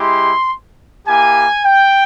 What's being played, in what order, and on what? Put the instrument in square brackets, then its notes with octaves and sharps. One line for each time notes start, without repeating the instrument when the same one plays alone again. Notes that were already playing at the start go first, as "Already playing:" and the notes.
Already playing: [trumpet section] G#3 E4 G4 C6
A#3 E4 G4 G#5
G5